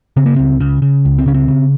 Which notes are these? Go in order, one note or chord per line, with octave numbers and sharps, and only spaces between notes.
C#3 C4
A#3
C#2 C4
C#3
C#3
C#2
C4
C#3 C#4
C4
C#3